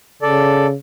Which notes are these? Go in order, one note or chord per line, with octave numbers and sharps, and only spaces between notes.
C#3 A4 D5